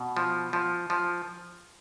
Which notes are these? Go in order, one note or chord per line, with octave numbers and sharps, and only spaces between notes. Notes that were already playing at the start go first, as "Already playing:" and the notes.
Already playing: B2
F3
F3
F3